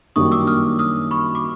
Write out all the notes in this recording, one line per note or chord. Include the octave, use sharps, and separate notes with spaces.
F#2 D#3 G3 A#3 D4 C#6 D#6
D6 E6
D#6 F6
D#6 F6
B5 C#6
D6